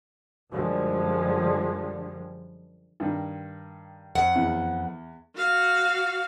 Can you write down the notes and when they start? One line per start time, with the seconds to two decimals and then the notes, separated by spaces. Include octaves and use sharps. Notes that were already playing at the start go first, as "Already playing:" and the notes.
0.52 F#2 D3 F3 G3 G#3
3.00 G2 D#3
4.15 F2 F#5
4.35 E2
5.36 F#4 F5